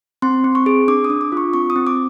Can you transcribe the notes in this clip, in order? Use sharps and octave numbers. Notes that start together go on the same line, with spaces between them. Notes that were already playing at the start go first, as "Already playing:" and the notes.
C4 C6
C4
C#6
G#4
D4 D6
D#6
D4
D6
F4 C#6
C4 C#6
D#6
C4
D6